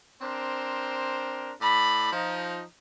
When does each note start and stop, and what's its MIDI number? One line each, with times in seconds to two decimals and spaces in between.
0.22 1.52 60
0.22 1.52 62
0.22 1.52 70
0.22 1.52 72
1.62 2.11 45
1.62 2.11 74
1.62 2.11 83
2.13 2.63 53
2.13 2.63 63